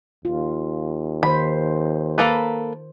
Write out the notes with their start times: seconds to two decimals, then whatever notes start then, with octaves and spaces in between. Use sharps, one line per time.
0.25 D#2 F4
1.23 D#3 C5 B5
2.18 A#3 A4 B4